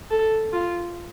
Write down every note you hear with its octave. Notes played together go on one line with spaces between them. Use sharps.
A4
F4